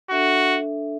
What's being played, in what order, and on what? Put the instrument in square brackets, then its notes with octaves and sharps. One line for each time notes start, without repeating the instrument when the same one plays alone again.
[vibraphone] D4 A4 E5 [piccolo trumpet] F#4